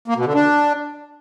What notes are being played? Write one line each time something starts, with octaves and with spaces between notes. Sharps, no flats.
A#3
B2
D3
D4